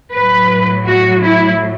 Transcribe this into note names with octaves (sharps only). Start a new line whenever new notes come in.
A2 F#3 B4
F#4
E4